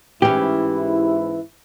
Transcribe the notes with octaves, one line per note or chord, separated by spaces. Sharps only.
G#2 E3 C#4 E4 G4